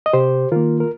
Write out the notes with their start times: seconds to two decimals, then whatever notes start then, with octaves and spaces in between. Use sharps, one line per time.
0.06 D#5
0.13 C3 G4 C5
0.52 D#3 A#3 F4 A#4
0.80 A#4